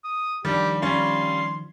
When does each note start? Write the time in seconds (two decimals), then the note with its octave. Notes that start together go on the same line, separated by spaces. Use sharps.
0.04 D#6
0.45 D#3 F3 G3 D4 G4
0.82 G3 C#4 F4 C6